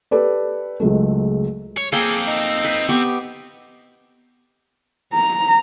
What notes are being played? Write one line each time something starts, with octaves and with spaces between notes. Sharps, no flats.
G4 A4 B4 D5
C#2 F#3 G#3 A3
C#5
A#3 C4 G#4 A4 G5
D#4
B4
B3 G4 C#6
A#5